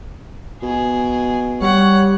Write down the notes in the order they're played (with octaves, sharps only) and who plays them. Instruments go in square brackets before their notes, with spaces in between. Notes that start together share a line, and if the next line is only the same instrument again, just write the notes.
[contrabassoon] B2 [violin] G#4
[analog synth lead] G3 [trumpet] C#5 [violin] F#5